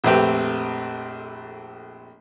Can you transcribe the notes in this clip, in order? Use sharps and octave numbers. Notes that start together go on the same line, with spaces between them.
A#1 F2 A3 C4 G4 B4